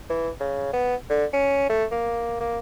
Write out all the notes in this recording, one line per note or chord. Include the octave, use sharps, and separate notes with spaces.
E3
C#3
B3
D3
C#4
A3
A#3
A#3